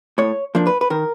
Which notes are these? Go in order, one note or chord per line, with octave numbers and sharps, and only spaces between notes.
A2 C#5
F3 A#3 D4
B4
B4
D#3 A#4